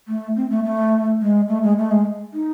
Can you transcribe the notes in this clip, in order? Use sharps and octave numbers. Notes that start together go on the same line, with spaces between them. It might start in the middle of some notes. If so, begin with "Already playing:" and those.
A3
C4
A3
A3
G#3
A3
G#3
A3
G#3
D#4